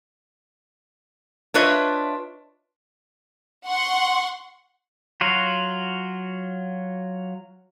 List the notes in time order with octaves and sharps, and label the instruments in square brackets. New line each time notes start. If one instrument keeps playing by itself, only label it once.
[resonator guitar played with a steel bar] D4 F4 B4 C#5 D#5 E5
[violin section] F#5 C6 C#6
[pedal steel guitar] F#3 F4 F#4